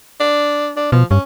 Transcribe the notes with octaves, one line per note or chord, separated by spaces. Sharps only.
D4
D4
B2 F3
G2 C#4